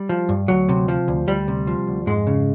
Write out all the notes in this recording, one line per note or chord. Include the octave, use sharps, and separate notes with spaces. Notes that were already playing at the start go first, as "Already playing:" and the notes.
Already playing: G3
F3
G2
D2 F#3
C3
F3
D2
D2 G3
C3
F3
D2
F2 G#2 G#3
C#3